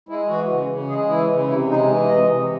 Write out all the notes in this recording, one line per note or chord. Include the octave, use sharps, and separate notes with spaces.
G#3 E4
E3 F#4
C#3
C#3
G#3 G#4
E3 E4
C#3
C3 E4
G#3 D#4
E3
C3 D#5
C3